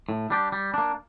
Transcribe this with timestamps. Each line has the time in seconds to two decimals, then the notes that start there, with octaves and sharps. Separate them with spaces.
0.09 A2
0.30 G3 D4 G4
0.52 G3
0.74 A#3 D4